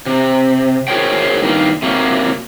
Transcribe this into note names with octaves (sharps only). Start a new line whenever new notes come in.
C3
F#4 G#4 A#4 C5 C#5 G5
G2 D#3 A#3
C3 F#3 A#3